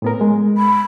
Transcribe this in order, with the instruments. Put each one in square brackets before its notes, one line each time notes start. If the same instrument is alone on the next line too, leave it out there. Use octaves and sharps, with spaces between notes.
[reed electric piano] A2 B3 A#4
G#3
[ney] B5